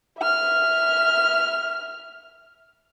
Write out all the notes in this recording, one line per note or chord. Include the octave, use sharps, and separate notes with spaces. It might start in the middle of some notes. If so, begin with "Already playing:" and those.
E5 F6